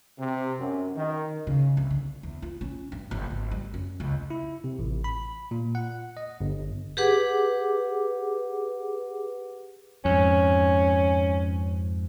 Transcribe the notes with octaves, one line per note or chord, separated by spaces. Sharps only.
C3
F#2
D#3
C#3
C2
D3
E2
F4
C#4
G2
G1
G#1
G3
F#2
C#2
E4
C3
A1
B5
A#2
F#5
D#5
G1
G4 G#4 B4 F#5 D6
F2 G#2 C#4